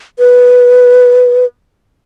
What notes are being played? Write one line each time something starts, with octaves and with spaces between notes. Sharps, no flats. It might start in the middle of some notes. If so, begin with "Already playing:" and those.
B4